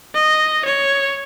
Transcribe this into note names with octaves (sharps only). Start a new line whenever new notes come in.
D#5
C#5